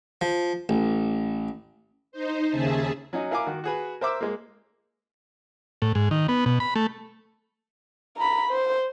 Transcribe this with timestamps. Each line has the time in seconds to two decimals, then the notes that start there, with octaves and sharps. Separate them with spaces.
0.21 F3
0.69 A1
2.12 D#4 C5
2.50 D#2 C#3 G#4 E5 A5
3.13 F#3 C#4 D#4
3.31 E4 A#4 F5 G#5 D6
3.46 D#3 F#4
3.64 F#4 G#4 B4
4.01 A#4 C5 E5 D6 E6
4.21 G#3 A#3
5.82 A2
5.95 G#2
6.11 D#3
6.28 B3
6.46 B2
6.60 B5
6.76 A3
8.17 A#5 B5
8.50 C5